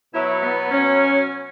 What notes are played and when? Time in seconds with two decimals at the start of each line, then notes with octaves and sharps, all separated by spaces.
0.14 B2 F#3 E4
0.43 B3
0.71 C#4